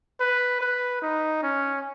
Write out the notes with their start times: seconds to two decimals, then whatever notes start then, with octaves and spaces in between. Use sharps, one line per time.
0.20 B4
0.60 B4
1.02 D#4
1.43 C#4